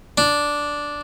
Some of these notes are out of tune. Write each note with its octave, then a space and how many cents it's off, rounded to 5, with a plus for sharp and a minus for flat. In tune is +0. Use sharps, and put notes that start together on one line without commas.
D4 -5